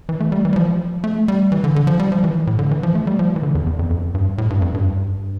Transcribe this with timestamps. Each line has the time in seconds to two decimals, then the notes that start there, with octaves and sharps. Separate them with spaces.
0.09 E3
0.20 A3
0.32 G3
0.45 E3
0.53 G3
0.56 F3
1.04 A3
1.28 G3
1.52 E3
1.64 D3
1.76 D3
1.87 F3
1.99 G3
2.12 F3
2.24 E3
2.47 A2
2.59 D3
2.71 E3
2.83 F3
2.95 A3
3.07 G3
3.19 F3
3.36 E3
3.43 D3
3.55 E2
3.67 E2
3.79 F2
3.90 F2
4.15 G2
4.38 A2
4.50 G2
4.62 F2
4.74 G2